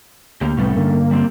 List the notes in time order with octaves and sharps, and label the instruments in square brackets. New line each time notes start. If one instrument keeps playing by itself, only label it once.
[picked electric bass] D2 [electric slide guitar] A#3 G4
[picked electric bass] C2 A2 [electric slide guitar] G3 A3 C#4 [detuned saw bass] B3
[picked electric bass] G2 D3 [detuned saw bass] A#3
[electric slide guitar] G3 C4 G4